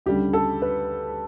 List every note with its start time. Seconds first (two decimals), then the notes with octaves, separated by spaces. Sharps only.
0.06 D2 C#3 G3 G4
0.33 A4
0.62 B4